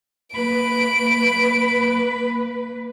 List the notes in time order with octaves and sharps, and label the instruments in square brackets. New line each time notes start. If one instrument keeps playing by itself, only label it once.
[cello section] A#3 B4 [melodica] B5 [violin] D7